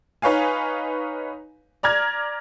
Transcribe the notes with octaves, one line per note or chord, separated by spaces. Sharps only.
D#4 B4 C#5 F5 G#5
D5 A#5 F6 G#6